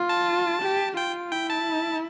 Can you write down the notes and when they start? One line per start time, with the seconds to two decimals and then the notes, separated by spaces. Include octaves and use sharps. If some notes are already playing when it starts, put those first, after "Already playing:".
Already playing: F4
0.09 A5
0.62 G4
0.97 F4 G5
1.31 E4 G5
1.50 A5